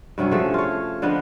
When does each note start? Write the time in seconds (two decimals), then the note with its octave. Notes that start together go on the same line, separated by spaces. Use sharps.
0.18 G2 C3 F#3 C#4
0.31 F3 A3 F#4 G#4
0.54 F4 C#5
1.02 D3 F3 B3 D#5